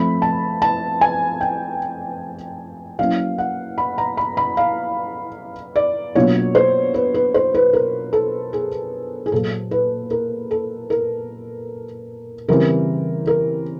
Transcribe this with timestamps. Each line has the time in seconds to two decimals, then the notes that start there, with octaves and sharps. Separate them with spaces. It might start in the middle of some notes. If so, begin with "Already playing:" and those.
Already playing: F3 A3 C4 B5
0.22 A5
0.62 A5
1.01 G#5
1.41 G5
2.99 F#3 A#3 C#4 E4 F5
3.38 F#5
3.78 B5
3.98 A#5
4.17 B5
4.37 B5
4.57 F5
5.76 D5
6.15 B2 F#3 A#3 D4 F4 C#5
6.55 C5
6.94 B4
7.14 B4
7.34 C5
7.54 B4
7.73 A#4
8.13 A4
8.53 G#4
9.26 G#4
9.32 A#2 F#3 A#3 A4
9.71 B4
10.11 A#4
10.51 A4
10.90 A#4
12.48 C#3 E3 G3 C4 A#4
13.27 A#4